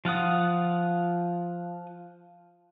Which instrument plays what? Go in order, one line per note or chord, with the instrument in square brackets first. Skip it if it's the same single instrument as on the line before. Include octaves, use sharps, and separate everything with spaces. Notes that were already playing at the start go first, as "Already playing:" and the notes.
[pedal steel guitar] F3 F4 F#5 D#6